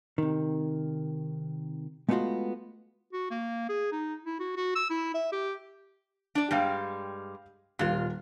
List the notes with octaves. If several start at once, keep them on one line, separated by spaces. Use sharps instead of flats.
C3 D#3
G#3 A3 B3 C#4 F4 F#4
F#4
A#3
G#4
D#4
E4
F#4
F#4
E6
E4
E5
G4
D4 D5
G2 G3 G#3 F5 G5
D#1 A#2 F4 G4 F#6